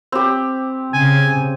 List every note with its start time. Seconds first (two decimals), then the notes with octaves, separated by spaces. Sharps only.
0.12 C4 G4
0.94 C#3 G#5